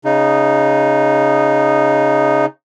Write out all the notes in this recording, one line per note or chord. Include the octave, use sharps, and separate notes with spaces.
C#3 D#4